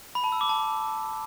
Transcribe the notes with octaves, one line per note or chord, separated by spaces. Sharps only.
B5
A5
E6
D6
A5